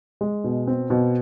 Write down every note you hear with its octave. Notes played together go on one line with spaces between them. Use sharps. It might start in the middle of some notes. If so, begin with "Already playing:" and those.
G#3
B2
C4
B2